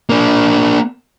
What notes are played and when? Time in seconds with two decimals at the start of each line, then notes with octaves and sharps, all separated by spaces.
0.10 A#3 D4